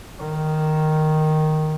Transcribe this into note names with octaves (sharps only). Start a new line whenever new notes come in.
D#3